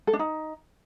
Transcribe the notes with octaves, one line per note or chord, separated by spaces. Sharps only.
A4
D4
D#4